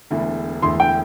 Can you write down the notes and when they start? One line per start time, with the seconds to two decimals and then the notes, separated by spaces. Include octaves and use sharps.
0.10 E1 E2 D3 A3 E4
0.62 E1 E2 D3 A3 E4 C6
0.80 G5